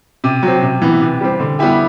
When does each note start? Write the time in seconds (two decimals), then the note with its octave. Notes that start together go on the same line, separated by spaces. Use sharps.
0.24 C3
0.43 F#3 C4
0.62 C3
0.82 E3 B3
1.01 C3
1.21 G3 C4
1.40 D3
1.59 G3 B3 E4 G4